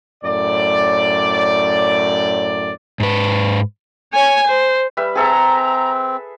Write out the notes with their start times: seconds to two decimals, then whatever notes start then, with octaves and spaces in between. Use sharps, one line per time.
0.24 F#2 A2 D5
3.00 G#2 B4
4.13 C#5 G#5
4.47 C5
4.97 G3 B4 E5
5.15 C4 G#4 A4 E5 A#5